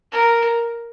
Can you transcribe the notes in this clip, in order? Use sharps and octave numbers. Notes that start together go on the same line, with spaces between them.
A#4